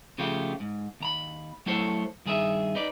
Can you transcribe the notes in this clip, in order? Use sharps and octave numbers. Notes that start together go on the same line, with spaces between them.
C#3 F3 A3 F4 G4
G#2
D#2 A#5 B5
F#3 A3 E4 A4 C5 C#5
G2 D#3 G#4 A#4 E5
D#4 B4 D5